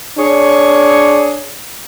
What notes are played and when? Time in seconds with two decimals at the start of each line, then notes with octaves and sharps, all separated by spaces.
0.18 D4 G#4 C#5